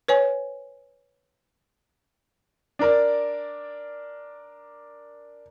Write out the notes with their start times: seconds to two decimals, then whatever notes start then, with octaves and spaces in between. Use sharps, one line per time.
0.08 B4 C#5 G#5
2.79 D4 A#4 D5